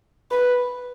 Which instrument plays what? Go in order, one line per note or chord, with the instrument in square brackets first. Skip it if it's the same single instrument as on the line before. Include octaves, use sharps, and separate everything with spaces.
[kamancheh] B4